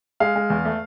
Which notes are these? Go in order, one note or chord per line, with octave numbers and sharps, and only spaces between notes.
G#3 F5
G#3
E2
A3